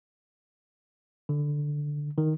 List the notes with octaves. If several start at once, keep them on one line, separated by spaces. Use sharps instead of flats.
D3
D#3